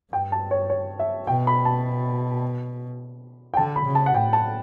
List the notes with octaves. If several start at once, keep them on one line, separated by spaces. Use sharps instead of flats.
G2 G5
A5
C#5
C#5
E5
B2 G5
B5
A5
G5
D3 A5
B5
C#3
A5
F#5
A2 G5
A5